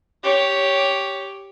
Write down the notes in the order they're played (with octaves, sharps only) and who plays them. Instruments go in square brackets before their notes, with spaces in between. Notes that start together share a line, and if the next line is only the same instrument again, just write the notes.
[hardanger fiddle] G4 C#5